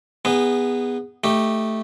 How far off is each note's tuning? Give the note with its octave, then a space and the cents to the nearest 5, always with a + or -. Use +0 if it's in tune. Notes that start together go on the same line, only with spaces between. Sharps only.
B3 +0 D#4 +0 G#4 -25
A3 +0 D#4 +0 G4 +0